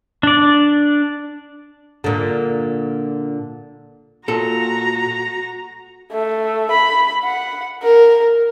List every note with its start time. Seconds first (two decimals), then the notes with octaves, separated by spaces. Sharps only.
0.23 D4 D5
2.04 A#2 D3
4.28 A#2 F#4 A4 A#5
6.12 A3
6.71 B5
7.24 F#5
7.83 A#4